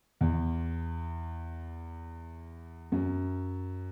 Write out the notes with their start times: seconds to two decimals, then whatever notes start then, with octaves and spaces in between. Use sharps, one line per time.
0.21 E2
2.92 F#2